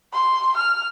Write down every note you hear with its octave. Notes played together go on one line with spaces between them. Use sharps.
C6
F6